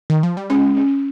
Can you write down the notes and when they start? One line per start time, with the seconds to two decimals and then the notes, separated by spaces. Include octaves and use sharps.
0.10 D#3
0.23 F3
0.37 G3
0.50 G#3 C#4
0.77 C#4